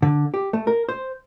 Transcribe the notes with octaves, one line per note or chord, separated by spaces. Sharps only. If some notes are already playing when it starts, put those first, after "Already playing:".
D3
G4
A3
A#4
C5